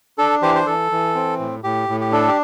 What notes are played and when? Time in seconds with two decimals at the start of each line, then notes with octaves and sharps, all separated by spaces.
0.18 D4 A4
0.42 E3 G4 C5
0.55 C5
0.66 E3 A4
0.92 E3
1.15 C4
1.40 A2
1.64 A2 G4
1.89 A2
2.00 G4
2.12 D4 A4
2.28 G4